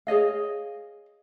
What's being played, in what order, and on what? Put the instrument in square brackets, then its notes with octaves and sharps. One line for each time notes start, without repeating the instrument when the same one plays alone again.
[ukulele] G#4 C#5 D#5 F5